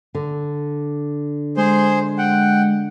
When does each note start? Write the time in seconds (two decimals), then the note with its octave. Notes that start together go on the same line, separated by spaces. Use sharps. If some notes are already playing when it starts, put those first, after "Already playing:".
0.15 D3
1.57 G#3 G#4 C5 C6
2.18 F#5 G5